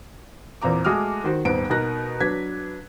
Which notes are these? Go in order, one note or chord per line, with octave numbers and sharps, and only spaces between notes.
E2 A#2 C4 A#5 D6
G#3 A3 F#4 D6 D#6 F6
D#3 F#4 C5
D#1 G#2 B3 D7
B2 D#4 F#4 A#4 F#6 A#6
F#3 D4 B4 G#6 B6